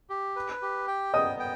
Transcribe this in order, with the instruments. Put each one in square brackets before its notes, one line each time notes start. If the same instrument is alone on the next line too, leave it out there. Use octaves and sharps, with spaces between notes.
[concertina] G4
B4
G4
G5
[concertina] B3 [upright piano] D#5 D#6
[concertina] G5